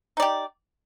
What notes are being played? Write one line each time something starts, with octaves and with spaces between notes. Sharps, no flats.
D#4 G4 D5